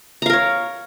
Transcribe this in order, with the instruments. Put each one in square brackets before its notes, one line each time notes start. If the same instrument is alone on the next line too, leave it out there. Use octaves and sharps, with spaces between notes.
[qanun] A#5
F5
A#4
C#5